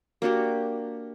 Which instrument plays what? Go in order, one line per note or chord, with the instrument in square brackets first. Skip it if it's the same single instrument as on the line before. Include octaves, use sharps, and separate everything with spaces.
[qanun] A#3 D4 F#4 G4